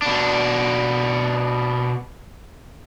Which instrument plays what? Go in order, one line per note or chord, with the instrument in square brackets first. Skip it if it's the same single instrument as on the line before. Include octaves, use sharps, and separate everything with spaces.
[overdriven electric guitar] B2 D4